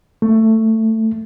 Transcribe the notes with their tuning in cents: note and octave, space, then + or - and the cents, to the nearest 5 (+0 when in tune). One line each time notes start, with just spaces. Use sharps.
A3 +15